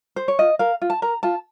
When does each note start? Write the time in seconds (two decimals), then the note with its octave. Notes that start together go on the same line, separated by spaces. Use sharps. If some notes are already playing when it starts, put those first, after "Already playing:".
0.16 C5
0.28 C#5
0.39 F4 D#5
0.59 A#4 F5
0.82 F4
0.90 A5
1.02 A#4 A#5
1.23 F4 A5